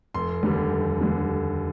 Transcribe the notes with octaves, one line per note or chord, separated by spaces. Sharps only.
F1 C6
D#2 D3 G3
F1
D#2 D3 G3